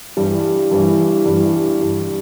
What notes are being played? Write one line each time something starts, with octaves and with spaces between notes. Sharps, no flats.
G2 E3 G3
G2 E3 G3
G2 E3 G3
G2 E3 G3